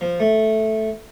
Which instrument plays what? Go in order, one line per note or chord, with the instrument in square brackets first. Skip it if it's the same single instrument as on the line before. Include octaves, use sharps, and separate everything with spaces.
[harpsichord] F3
A3